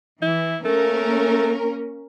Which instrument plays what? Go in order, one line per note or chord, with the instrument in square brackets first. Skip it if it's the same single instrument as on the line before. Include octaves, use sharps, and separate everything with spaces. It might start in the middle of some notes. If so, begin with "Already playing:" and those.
[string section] E3 [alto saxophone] E4
[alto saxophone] A3 [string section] A#3 C#4 A#4